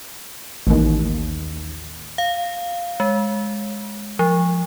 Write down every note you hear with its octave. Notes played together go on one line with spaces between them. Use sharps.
A1 D#2
F5
G#3
F3